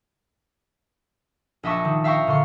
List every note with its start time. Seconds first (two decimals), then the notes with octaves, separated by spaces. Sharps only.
1.63 A#1 D4 D#5 E5 A5 C#6
1.85 D#3
2.04 E5 F5 G5 A#5 C#6
2.27 A#2 D3 C6 C#6